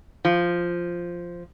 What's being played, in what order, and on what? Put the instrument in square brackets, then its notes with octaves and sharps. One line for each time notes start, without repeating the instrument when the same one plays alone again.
[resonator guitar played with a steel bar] F3